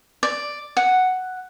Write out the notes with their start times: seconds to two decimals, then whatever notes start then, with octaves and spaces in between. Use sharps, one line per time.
0.23 D5
0.77 F#5